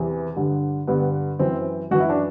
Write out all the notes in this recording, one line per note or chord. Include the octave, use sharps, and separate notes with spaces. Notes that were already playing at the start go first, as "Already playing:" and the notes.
Already playing: E2 C3 E3
G2 D3
G2 D3 B3
F#2 E3 C4
F#2 E3 F#4
E4
D4